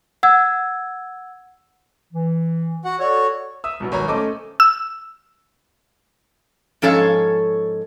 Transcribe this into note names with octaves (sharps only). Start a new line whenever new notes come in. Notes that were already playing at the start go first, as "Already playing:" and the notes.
F#5 E6 G#6
E3
F#4 F#5
F#4 A4 C#5 D5
E5 D#6 E6
C2 B2 F#3
G#1 C#5 A#5
A3 C#4 A4 C5 D#5 D6
E6
G#2 F3 C#4 A4 C#5 F5